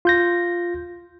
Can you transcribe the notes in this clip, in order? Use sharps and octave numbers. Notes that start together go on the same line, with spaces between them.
F4 G6 A#6